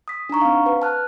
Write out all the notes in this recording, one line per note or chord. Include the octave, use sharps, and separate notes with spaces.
D#6 B6
D4 D#4 A#5 C#6
C4 F5
B4
A5 F6 F#6